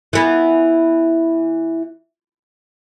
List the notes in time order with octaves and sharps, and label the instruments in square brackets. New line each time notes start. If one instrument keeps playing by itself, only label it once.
[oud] E3 B3